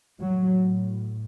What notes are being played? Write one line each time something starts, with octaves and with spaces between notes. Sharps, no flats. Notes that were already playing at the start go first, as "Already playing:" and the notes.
A2 F#3